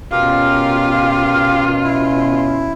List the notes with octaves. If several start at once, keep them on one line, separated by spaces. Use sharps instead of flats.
B2 C#4 F4 G4 A#4 F5
E4